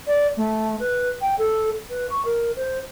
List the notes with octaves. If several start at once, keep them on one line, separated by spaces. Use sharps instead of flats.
D5
A3
B4
G5
A4
B4
C#6
A#4
C5